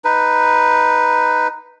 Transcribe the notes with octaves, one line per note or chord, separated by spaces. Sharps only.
D#4 B4